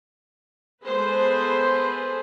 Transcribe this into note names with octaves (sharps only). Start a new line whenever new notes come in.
G#3 B3 G#4 A4 B4 C5